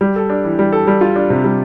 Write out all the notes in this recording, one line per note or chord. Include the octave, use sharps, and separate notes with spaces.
G3
A4
D4
E3
G3
A4
G3
F4
D4
C3
G3